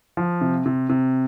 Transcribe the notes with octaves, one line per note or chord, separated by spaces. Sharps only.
F3
C3
C3
C3